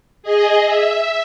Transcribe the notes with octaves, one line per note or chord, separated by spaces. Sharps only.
G#4 D#5
E5